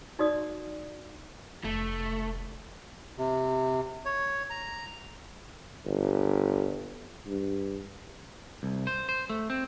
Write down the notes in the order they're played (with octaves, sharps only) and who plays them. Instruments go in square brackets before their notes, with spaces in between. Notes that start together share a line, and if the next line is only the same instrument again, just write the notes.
[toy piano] D#4 F#4 D5 D#6
[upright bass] F1 [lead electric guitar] A3
[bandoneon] C3
C#5
A#5
[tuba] G1
G2
[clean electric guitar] C2
C5
C5
A3
C4